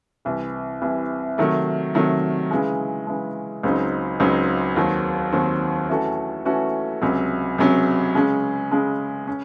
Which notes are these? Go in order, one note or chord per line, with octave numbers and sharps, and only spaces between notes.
C2 C3 E3
C2 C3 E3
C3 D#3 F#3 A3
C3 D#3 F#3 A3
C#3 E3 G#3
C#3 E3 G#3
C#2 C#3 F#3 C4 D#4
C#2 C#3 F#3 C4 D#4
D#2 D#3 F#3 C4
D#2 D#3 F#3 C4
E3 A3 C#4 F#4 A4
E3 A3 C#4 F#4 A4
C#2 C3 F#3 C#4
C#2 C3 F#3 C#4
C#3 G#3 C#4
C#3 G#3 C#4
C#4